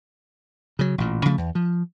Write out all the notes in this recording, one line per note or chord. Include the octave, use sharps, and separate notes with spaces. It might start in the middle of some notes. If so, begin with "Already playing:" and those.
C#3 F#3
A1 A#2
C#3 F3 A3
E2
F3